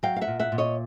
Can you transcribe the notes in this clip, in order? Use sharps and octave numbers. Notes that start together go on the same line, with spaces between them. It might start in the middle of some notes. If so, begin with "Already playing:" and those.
F#3 F5 G5
F5
E5 F#5
A#2
E5 F#5
A#2
C#5 D#5